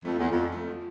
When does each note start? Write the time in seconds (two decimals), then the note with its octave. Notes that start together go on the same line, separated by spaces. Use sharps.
0.05 F2 A3
0.18 E2 F3
0.31 F2
0.36 F3
0.52 A3
0.68 F3